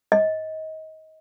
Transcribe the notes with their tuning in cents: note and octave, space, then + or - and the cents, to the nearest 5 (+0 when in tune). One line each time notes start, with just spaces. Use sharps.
D#5 +25